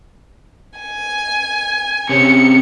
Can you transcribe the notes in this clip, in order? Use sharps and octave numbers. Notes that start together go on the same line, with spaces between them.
G#5
C3 C#4 C#7